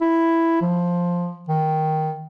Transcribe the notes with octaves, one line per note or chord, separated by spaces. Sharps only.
E4
F3
D#3